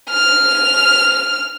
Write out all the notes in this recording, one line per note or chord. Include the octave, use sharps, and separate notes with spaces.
F6